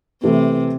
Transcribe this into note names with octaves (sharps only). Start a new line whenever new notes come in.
C3 E3 A3 E4